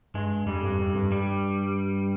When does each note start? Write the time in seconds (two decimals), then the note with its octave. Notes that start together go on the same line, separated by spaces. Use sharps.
0.14 G2 G#3
0.47 F2 G3
0.64 G2
0.79 F2
0.95 G2
1.12 G3